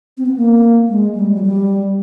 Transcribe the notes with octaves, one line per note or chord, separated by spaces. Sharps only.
C4
B3
A#3
G#3
G3
F#3
G3